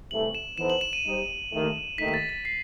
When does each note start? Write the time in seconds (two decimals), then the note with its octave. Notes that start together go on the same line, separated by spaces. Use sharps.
0.11 C2 C3 E3 A3 F#7
0.35 E7
0.57 E3 B3 D#4 A4 C5 E7
0.70 F#7
0.81 E7
0.93 D#7
1.05 G3 D#4 G4 C5
1.52 D#2 D#3 A3
1.98 D#2 D#3 A3 D#4 B6
2.08 B6
2.14 A6
2.29 B6
2.45 C7